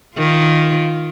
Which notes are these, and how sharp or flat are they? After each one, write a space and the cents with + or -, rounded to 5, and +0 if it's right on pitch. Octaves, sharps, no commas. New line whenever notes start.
D#3 +0 F4 +0